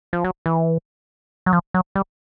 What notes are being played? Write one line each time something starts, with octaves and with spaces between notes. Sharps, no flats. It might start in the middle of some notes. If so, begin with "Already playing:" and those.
F3
F#3
E3
F#3
F3
F#3
G3